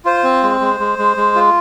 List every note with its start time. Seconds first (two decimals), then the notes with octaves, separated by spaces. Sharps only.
0.05 F4 C5
0.24 C4
0.43 G#3
0.61 G#3
0.80 G#3
0.99 G#3
1.17 G#3
1.35 F4